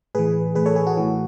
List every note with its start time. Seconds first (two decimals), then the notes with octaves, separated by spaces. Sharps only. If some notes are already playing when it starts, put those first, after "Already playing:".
0.15 A2 E3 G#4 B4
0.55 A2 E3 G#4 B4
0.66 A4 C#5
0.76 G#4
0.87 F#4
0.97 A2 E3